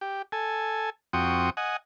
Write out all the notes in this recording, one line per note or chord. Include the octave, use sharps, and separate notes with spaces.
G4
A4 G#5
F2 C4 F#4 G5 C#6 D#6
D#5 F#5 G#5